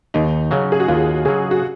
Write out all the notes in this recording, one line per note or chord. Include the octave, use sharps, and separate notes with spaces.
D#2 D#4
C#3 F#3 C#4
G#4
F#4
D#2 F4
C#3 F#3 G#4
F#4